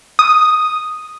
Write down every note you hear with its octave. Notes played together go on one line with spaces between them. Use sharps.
D#6